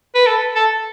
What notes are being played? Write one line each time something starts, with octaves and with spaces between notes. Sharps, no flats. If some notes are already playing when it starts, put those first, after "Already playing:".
B4
A4
A4